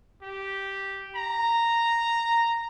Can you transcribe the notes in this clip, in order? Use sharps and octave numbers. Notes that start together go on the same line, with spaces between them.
G4
A#5